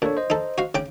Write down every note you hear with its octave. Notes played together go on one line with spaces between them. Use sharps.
A#2 D4 A4 C#5
C5 D#5
D#4 A4
F#4 F5
C#3 G5 D6